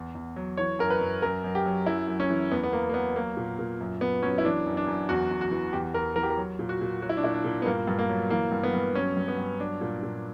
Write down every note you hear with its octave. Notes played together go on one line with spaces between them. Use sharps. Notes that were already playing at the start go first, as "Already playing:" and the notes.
Already playing: E2
E2
F#3
E3 C#5
F#2 A#4
B4
F#2
F#2 A#4
F#2
G4
F#3
F#2 E4
F#2
C#4
E3
E2 B3
B3
E2 A#3
A#3
F#3 B3
F#3 A#3
A#2
A#2
F#2
F#2 B3
F#3 C#4
E4
E3 D4
F#2
D4
F#2
E2 F#4
E2
F#4
E3
E2 G4
E2 A#4
E3 A#4
G4
A#4
F#3
A#2
F#4
A#2
F#3 F#4
E4
D4
A#2 E4
D4
A#2
B3
G2 A#3
G2
A#3
F#3
E3 A#3
G2
B3
G2
F#3 C#4
G2
B3
G2
F#3 D4
A#2
A#2